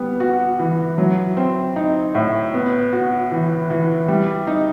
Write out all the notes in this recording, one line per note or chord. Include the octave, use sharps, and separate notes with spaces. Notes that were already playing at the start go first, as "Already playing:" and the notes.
Already playing: G3 B3
F#4
E3
F#3
C4
D#4
A2
B3
F#4
E3
E3
G3
D#4